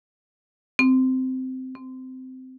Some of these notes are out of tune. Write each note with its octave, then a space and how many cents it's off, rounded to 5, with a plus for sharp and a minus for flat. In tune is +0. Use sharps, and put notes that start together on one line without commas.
C4 -15
C4 -20